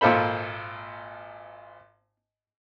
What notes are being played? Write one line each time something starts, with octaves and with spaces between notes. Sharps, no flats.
G#1 A#2 F4 A4 C5 B5